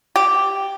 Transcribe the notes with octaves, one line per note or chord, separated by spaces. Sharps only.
G4